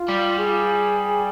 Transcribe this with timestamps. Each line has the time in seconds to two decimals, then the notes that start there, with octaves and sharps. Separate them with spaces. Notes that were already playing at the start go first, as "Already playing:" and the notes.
Already playing: F4
0.09 G3
0.38 G#4